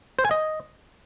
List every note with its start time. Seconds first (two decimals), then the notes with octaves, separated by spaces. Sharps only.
0.19 C5
0.25 G#5
0.31 D#5